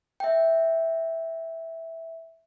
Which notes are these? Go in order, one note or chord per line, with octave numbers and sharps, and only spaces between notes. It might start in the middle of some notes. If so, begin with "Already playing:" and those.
E5 G5